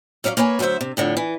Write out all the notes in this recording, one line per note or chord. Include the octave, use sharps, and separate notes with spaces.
F#3 C#4 D5 E5 F5
A#3 B4 C#5 F#5 G#5
D2 F#3 A#4 C5 E5
C3
F2 A2 D3
E3